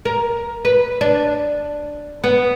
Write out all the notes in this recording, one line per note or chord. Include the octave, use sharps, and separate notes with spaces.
A#4
B4
D4
B3